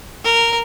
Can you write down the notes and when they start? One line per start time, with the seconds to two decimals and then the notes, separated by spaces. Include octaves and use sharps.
0.24 A#4